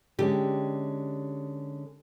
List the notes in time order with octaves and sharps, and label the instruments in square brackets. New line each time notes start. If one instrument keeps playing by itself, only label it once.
[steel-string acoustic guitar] D3 G#3 C#4 [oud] G4